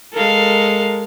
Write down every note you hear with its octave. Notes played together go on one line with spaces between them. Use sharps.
G#3 A4 A#4 F5